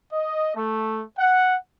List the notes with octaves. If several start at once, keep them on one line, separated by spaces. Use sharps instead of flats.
D#5
A3
F#5